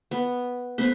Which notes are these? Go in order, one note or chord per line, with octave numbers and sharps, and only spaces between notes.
B3
A3 B3 C5 B5